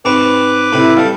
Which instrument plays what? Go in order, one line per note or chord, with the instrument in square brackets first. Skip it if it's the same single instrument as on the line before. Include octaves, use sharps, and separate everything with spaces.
[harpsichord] G#2 C4 C#6 [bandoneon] B4 D6
[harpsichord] A2 C3 B5 [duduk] E4
[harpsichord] G3 A3 [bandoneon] F5